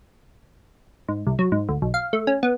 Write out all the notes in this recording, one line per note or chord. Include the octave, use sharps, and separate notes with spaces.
G#2
C2
F#3
G#2
D2
B1
F5
A3
C#4
B3